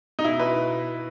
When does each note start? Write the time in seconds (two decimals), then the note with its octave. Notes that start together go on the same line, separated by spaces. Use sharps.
0.19 D#4
0.24 B2 E4
0.39 B2 B4